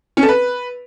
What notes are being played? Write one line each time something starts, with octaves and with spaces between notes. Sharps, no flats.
C#4
A4
B4